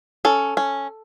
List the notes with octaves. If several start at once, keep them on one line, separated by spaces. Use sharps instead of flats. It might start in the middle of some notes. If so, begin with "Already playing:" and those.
C#4 A4
C#4